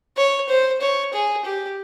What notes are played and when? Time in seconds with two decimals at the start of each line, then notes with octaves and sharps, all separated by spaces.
0.17 C#5
0.49 C5
0.81 C#5
1.13 G#4
1.45 G4